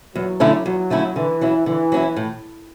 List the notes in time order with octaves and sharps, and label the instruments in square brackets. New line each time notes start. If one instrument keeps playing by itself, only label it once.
[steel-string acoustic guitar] E2 [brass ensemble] F#3
[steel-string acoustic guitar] D3 A3 C#4 E4
[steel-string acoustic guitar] E2 [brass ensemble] F#3
[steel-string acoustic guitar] D3 A3 C#4 E4
[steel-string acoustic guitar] D3 [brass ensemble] E3
[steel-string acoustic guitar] F#3 C#4 E4
[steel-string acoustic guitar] D3 [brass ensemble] E3
[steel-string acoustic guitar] F#3 C#4 E4
A2